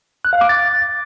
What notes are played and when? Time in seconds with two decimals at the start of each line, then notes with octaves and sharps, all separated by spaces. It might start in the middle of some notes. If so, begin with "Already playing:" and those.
0.25 F#6
0.33 F5
0.41 D6
0.49 A6